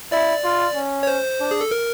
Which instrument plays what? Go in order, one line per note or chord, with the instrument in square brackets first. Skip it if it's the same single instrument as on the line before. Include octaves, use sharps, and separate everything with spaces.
[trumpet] E4 [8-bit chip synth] D5
[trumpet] F4
C#4
[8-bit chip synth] C#5
C5
[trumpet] D4
[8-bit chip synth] G#4
A4
A#4